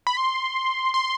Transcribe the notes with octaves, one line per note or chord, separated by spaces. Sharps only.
B5
C6
C6